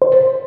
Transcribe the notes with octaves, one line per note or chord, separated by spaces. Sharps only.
C5